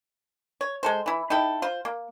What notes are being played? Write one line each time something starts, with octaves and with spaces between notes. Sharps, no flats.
C#5
G#3 A4 C5
E3 E4
D#4 E4 A4 G5
F4 C5
A#3